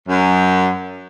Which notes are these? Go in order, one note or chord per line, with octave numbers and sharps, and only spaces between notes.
F#2